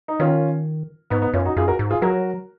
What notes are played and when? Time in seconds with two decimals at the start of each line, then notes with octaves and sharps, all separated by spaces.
0.08 D#4
0.20 D#3 C#4 F4
1.10 G#2 B3 D#4
1.22 B3 D#4
1.34 F#2 C#4 F4
1.45 D#4 F#4
1.57 F#2 F4 G#4
1.67 F#4 A#4
1.79 G#2
1.90 F4 G#4
2.02 F#3 F#4 A#4